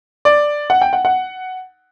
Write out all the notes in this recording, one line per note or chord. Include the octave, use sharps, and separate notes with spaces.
D5
F#5
G5
F#5
F#5